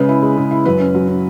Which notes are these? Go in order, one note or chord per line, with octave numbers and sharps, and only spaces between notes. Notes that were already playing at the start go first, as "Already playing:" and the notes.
Already playing: C#3 G#3 B4
E4
G#3
C#3
E4
F#2 B4
C#4
F#3
C#4